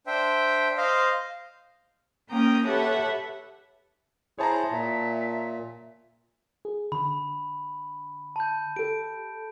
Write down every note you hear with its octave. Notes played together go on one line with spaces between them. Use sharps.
D4 C5 E5 G5
C5 D#5 F5
A#3 C#4 G5 A#5 D#6
G4 A4 B4 C#5 E5 F#5
E4 G#4 C5 C#5 A5 A#5
A#2 E5
G#4
D3 B5
A5 G6
G4 A4 D7